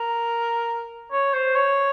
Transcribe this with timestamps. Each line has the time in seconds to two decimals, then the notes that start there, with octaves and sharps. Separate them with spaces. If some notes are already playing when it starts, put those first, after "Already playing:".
Already playing: A#4
1.11 C#5
1.33 C5
1.56 C#5